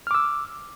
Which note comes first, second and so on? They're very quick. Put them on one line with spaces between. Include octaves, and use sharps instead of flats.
F6 D6 E6